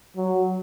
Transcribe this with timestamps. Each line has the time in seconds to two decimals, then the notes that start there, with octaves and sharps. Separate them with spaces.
0.17 F#3